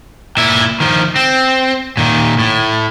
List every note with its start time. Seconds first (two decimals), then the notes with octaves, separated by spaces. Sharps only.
0.37 A#2 E4
0.80 D#3 F3
1.16 C4
1.97 A#2 D#3
2.39 A2